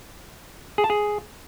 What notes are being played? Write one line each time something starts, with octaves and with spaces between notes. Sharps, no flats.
G#4
A5
G#4